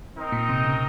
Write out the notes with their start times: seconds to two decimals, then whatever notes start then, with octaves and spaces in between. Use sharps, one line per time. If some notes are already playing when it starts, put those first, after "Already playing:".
0.16 C4 D#4 A#4 D#5
0.32 A#2
0.49 C3
0.65 C#3